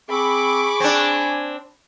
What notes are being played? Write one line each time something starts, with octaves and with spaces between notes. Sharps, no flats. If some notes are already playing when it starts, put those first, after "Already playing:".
C4 G#4 B5 C#6 D6
C4 D4 G#5